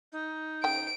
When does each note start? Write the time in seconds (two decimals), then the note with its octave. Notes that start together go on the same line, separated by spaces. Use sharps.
0.12 D#4
0.64 C#3 G5 D7